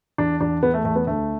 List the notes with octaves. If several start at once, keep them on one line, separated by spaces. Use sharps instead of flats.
E2 D4
E2 D4
E2 B3
A3
E2 A3
B3
D2 A3